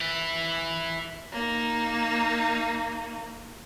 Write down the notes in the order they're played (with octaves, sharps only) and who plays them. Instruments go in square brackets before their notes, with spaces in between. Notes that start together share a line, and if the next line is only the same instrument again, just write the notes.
[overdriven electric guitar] E4 B4
[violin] A#3 D#4